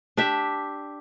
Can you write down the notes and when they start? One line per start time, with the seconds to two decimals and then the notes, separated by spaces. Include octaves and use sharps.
0.17 D4 G4 E5